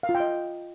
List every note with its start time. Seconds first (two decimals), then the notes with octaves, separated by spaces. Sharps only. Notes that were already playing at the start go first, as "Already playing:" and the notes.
0.03 F5
0.09 F4
0.15 G5
0.20 D#5